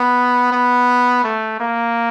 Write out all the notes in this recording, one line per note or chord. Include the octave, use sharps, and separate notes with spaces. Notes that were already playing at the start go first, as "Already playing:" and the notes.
Already playing: B3
B3
A3
A#3